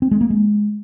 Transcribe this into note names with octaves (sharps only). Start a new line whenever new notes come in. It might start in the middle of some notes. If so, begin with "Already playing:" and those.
C4
G#3
A#3
G#3